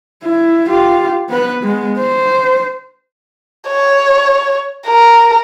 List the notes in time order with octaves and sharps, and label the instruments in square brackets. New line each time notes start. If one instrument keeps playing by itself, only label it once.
[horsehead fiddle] E4
F4 G4
B3 B4
G#3 B3
C5
[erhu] C#5
A#4